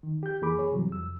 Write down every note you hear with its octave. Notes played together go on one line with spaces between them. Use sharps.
D#3
G4 G6
F2 E3 A#3 G#4 B5 D6
G#4 C#5
G#2 C3 E3 F#3 G3
F2 E6